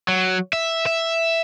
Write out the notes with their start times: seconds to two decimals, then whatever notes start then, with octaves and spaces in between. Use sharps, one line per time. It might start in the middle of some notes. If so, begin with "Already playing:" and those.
0.08 F#3
0.53 E5
0.86 E5